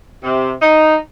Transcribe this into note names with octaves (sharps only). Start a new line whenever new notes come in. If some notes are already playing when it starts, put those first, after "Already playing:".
C3
D#4